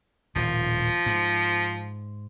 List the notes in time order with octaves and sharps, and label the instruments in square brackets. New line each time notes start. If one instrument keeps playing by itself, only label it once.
[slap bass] D#1 A2 [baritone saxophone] F3
[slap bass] G#2